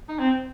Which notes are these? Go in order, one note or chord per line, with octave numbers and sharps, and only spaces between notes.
D#4
C4